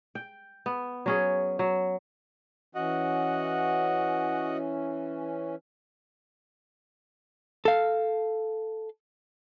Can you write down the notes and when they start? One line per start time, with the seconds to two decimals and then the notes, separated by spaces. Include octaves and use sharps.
0.15 G5
0.66 B3
1.06 F#3 C#4 G#4
1.59 F#3
2.75 E3 C#4 F#4 D#5 F#5
7.65 A4 F5